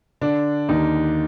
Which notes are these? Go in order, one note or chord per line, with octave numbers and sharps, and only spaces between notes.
D3 D4
D#2 D#4